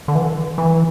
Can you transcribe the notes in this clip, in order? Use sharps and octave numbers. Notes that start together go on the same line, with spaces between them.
D3
E3
E3